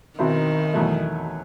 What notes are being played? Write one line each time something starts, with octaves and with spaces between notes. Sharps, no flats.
B1 B2 D#3 F#3 C4 E4
E2 B2 F#3 A3